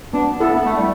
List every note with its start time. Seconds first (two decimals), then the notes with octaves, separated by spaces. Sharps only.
0.14 B3 D4
0.40 B3 E4 A4
0.54 B3
0.66 A3
0.76 G3